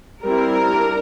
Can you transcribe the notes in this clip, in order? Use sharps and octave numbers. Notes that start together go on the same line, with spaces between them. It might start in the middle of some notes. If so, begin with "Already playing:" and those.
G3 C4 E4 A#4
D4